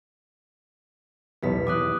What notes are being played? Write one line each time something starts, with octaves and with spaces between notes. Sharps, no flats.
B1 E2 G4 B4 B6
E2 D6 D#6 F#6